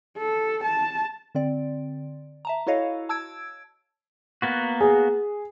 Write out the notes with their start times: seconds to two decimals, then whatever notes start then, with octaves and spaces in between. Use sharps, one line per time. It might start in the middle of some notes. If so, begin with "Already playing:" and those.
0.18 A4
0.64 A5
1.35 D3 C4 D5
2.45 E5 A5 A#5
2.67 E4 F#4 A4 C#5 D#5 F5
3.09 A5 E6 G#6 D7
4.42 A#3 B3 F#4
4.81 G#4